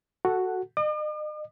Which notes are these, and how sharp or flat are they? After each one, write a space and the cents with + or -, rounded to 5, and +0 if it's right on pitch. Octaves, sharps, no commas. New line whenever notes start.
F#4 +0 A4 +0 F#5 +0
D#5 -40 D6 +45